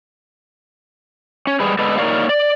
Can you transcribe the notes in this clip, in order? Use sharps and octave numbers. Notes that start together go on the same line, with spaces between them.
C#4
G3 G#3 G#4 B4
D3 G#3 B3 A4 B4 D#5
A#3 D#4 A#4 C#5 D5 F5
D5